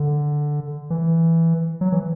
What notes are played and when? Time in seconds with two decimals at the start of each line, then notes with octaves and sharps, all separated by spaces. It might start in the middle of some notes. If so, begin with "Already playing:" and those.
Already playing: D3
0.90 E3
1.81 F#3
1.92 E3